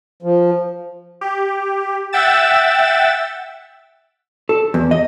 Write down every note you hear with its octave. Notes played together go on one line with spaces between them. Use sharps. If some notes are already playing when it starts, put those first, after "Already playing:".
F3
G4
E5 F#5 G5 E6 A6 E7
A4
E2
D#5